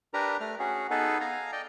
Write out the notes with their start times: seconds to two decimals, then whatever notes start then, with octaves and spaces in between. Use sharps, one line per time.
0.14 D4 G4 A#4 B4 A#5
0.40 A3 F6
0.59 C#4 F#4 G#4
0.90 B3 D#4 G#4 A4 B4
1.21 F5 G#5 A#5
1.52 D5 D#5 G5